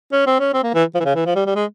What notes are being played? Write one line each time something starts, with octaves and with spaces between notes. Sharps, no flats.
C#4
C4
C#4
C4
A#3
E3
F3
E3
C#3
E3
F3
G3
G3
G#3